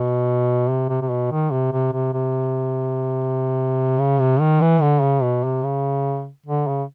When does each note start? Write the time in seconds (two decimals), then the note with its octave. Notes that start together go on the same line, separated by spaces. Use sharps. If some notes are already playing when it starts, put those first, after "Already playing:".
Already playing: B2
0.69 C3
0.89 C3
1.01 C3
1.10 B2
1.31 D#3
1.51 C3
1.72 C3
1.92 C3
2.13 C3
3.99 C#3
4.20 C3
4.40 D#3
4.61 E3
4.82 D3
5.02 C#3
5.22 B2
5.44 C3
5.64 C#3
6.46 D3
6.67 C#3